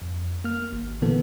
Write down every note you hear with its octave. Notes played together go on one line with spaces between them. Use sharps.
F2
A#3 F6
G#1
A#2 D3 E3 A#3 B3 A4